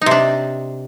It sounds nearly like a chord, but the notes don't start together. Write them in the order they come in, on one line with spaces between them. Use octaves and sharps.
D#4 C3 D4